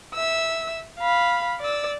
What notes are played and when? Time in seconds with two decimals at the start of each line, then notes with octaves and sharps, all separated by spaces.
0.15 E5 E6
0.99 F5 B5
1.61 D5 E6